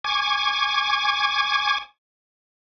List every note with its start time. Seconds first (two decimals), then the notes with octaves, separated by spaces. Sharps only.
0.04 G#5 C#6 D6 G#6